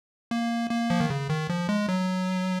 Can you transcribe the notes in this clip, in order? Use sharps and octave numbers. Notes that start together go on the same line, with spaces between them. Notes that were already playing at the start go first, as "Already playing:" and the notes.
A#3
A#3
F3
D#3
C#3
D#3
F3
G#3
F#3